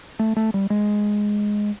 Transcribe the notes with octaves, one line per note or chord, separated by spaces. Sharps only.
A3
A3
G3
G#3